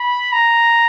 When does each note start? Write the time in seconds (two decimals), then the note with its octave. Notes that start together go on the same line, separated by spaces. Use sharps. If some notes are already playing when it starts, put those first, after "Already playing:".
Already playing: B5
0.32 A#5